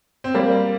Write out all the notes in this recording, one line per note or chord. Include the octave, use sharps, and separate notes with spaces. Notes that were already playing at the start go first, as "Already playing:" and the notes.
C4
G3 A#3